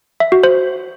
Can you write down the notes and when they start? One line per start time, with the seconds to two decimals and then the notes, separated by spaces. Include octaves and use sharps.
0.20 E5
0.32 F#4
0.43 C5